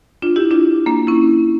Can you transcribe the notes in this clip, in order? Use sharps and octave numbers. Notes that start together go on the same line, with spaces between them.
D4 F4
E4 G4
D4 F4
A#3 D4
C#4 E4